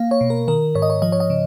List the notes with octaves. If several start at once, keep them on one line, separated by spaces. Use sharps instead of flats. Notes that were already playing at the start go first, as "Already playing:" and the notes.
Already playing: A#3 F5
C#5
B2
A#4
D#3 A#4
G#2 C#5
D#5
C#5
F3 D#5
C#5
D#5
C#3